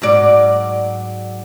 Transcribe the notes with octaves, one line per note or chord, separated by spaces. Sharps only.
G#2 F#3 D5